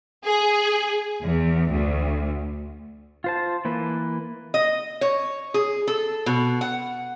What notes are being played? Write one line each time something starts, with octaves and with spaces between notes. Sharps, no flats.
G#4
E2
D2
F4 C5 A5
E3 A#3 B4
D#5
C#5
G#4
A4
B2
F#5